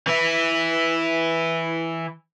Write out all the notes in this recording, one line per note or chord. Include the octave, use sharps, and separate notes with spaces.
E3 E4